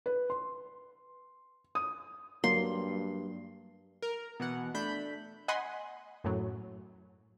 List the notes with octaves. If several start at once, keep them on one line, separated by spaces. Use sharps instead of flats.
B4
C6
D#6
G2 F#3 A#3 C6
A#4
B2 E3 F#5
A3 D4 B5 G6
D#5 F#5 G#5 B5 C6
F#2 A2 F#3